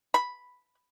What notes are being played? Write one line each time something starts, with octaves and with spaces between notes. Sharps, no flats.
B5